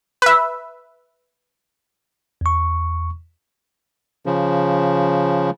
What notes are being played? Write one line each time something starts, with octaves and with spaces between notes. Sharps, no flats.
B4 E5
E2 C#6
C#3 F3